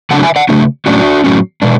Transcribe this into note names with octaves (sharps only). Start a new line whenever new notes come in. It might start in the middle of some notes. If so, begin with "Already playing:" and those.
C#3 F#3 A3 D4 F#5 A5
E5 G#5
D5 F#5
C#3 F#3 A3 D4
A2 F#3 C#4 D4 F#4
A2 F#3 C#4
B2 G#3 D4